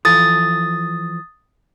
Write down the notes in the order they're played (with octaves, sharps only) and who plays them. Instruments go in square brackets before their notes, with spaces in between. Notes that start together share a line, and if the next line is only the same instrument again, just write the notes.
[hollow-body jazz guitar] E3 F3 A4 [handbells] D#6 A6